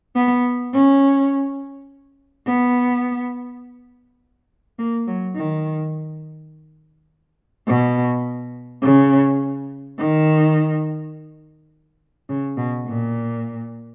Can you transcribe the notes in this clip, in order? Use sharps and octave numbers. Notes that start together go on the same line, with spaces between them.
B3
C#4
B3
A#3
F#3
D#3
B2
C#3
D#3
C#3
B2
A#2